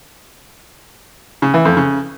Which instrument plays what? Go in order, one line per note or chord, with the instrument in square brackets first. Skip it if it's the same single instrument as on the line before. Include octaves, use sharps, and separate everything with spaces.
[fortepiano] C#3
E3
F2
C#3